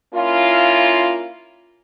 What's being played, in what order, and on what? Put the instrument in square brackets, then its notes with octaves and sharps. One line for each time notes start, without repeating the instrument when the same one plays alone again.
[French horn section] A#3 C#4 E4 F4